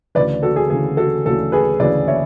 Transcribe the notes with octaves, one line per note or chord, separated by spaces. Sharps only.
D2 C#3 E3 B4 D5
F#4 A4
G#4
D2 C#3 E3 G#4
F#4 A4
D2 C#3 E3 F#4 A4
G#4 B4
D2 C#3 E3 B4 D5
C#5 E5